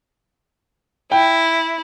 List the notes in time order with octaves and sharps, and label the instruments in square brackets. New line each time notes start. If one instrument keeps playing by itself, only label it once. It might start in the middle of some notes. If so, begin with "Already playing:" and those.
[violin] E4 [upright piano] G5